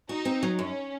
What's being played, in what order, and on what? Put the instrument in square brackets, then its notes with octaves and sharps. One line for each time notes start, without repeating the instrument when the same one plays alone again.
[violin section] D#4 [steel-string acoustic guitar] F#4
[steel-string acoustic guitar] C4
F#3
[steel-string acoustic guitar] F#2 [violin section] C#4